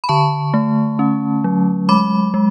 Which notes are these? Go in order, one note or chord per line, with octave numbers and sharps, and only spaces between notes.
B5
D3 A5 C#6
A3
C#4
F#3
G#3 B5 D6
G#3